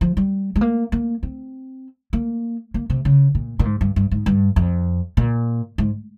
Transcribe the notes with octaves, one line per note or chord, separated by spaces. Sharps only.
F3
G3
G#3
A#3
A#3
C4
A#3
A#3
C3
C#3
A#2
A#2
G#2
G2
G2
G#2
G2
F2
A#2
G#2